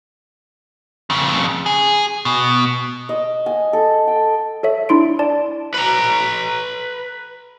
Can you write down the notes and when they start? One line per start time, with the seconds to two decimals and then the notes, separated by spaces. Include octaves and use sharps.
1.10 F2 C#3
1.66 G#4
2.25 B2
3.09 D#5
3.46 G#5
3.73 A4
4.07 G5
4.63 A4 C#5 E5
4.89 D4 E4 C6 D7
5.19 D5 A5
5.74 B4 A#5